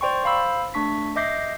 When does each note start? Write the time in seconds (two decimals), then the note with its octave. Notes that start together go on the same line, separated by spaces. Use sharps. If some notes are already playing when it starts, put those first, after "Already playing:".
0.01 C5 D5 G5 C6 C#6
0.24 C5 F5 B5 E6
0.74 A3 D4 C#6 B6
1.16 D#5 E5 D6 G6 A#6 C7